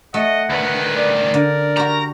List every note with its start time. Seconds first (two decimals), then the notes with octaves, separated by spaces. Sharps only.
0.14 A3 D#5 F#5
0.50 D2 D#3 B4
0.96 D5
1.34 D3 A#4
1.77 F#4 G4 A#5